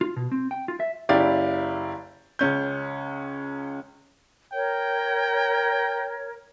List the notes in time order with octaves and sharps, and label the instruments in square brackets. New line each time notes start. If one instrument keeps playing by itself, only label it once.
[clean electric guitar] F4
B2
C4
G5
F4
E5
[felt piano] F#1 E4 G4 D5 F5 A6
C#2 C#4 G6
[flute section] A#4 C#5 [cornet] G5